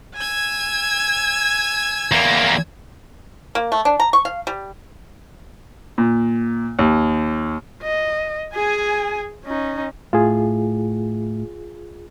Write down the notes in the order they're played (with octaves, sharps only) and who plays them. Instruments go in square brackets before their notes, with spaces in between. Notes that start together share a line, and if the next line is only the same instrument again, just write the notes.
[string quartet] G#5 E6 G#6
[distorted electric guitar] E2 A#3
[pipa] A#3
A3
D4
A#5
C#6
F5
G3
[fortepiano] A#2
D#2
[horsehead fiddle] D#5
G#4 G#5
C#4 D#4
[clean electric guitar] A2 [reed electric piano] F4 G#4